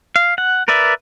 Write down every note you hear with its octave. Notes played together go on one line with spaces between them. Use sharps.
F5
F#5
A#4 B4 D5 E5